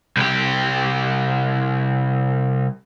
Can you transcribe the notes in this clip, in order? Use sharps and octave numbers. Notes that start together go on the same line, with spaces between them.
C2 G4